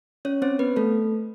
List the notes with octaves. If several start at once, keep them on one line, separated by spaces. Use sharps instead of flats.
C#4 C#5
C4 C5
B3 B4
A3 A4